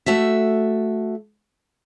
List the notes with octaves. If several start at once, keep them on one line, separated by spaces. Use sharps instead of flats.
A3 F#4 E5